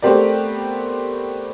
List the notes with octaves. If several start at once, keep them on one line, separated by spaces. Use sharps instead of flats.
A3 B3 C4 G4 A#4 D5